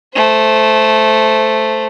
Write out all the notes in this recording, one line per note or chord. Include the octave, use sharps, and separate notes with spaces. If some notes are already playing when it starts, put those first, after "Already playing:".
A3 C5